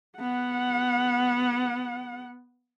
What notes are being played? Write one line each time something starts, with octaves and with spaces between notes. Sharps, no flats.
B3 F#5